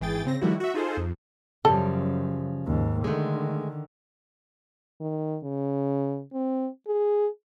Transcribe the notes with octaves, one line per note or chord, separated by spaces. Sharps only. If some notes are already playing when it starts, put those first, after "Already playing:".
G#1 E3 G#4 G5 A6
C#3 C4 A#6
D#3 F3 G3 A3 E4 F#4
F#4 E5
D#4 F4 G#4 A4 C5
F2
F#2 C#3 F3 G3 A4
D#2 G#2
D3 D#3 G#3 A3
D#3
C#3
C4
G#4